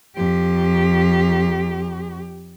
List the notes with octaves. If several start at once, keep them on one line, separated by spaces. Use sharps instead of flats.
F2 G4